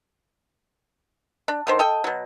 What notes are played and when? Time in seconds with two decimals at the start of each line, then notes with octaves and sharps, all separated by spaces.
1.48 D4
1.67 D3 D#3 C5
1.79 A4 D#5 G5
2.04 B2 F#3